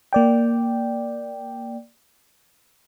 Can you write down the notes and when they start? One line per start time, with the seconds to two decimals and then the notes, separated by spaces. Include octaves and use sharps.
0.13 A#3 D5 G5